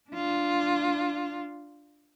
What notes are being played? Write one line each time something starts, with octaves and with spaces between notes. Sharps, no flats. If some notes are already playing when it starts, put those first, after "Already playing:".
D4 F4